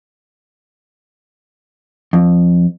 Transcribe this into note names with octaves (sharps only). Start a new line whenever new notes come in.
F2